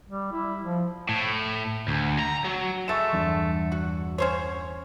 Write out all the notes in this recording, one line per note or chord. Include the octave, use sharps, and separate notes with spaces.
G3
E4
F3
A2
D2
A#5
F#3
G#3 A3 C#6 A6 E7
E2 G2
F#4
C#4 C5 C#5